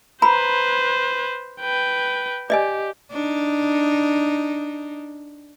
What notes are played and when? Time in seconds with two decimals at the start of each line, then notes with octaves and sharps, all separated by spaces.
0.22 B4 C5 A#5 B5
1.61 B4 G5
2.50 G4 D5 D#5 G#5
3.11 D4 D#4